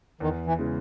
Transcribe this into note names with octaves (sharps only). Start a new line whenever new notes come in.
E2 D#3
E3
C#3 E3 G#3 B3